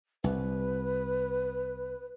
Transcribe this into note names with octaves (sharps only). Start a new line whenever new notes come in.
C2 B4